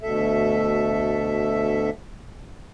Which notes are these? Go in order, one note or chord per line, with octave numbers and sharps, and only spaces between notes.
D2 B2 A4 E5